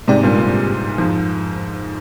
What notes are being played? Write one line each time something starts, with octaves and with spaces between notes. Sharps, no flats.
G#2 C3 G#3 C4 G4 D5
G2 A#2
G2
F2 G#2